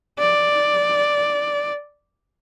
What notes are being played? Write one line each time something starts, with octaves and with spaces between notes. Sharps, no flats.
D5